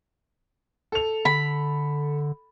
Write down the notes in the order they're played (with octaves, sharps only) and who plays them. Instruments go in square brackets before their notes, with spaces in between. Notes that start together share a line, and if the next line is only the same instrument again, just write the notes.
[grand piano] A4 F7
[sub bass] D3 [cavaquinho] B5